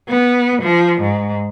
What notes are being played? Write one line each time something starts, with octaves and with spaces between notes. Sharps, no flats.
B3
F3
G#2